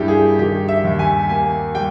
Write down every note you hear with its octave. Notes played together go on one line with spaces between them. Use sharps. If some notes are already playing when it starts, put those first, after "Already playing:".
Already playing: G2 A#3 E4 G4
G#4
D#3 G4
E5
D#2
G#5
A#3 G#5
G3 G5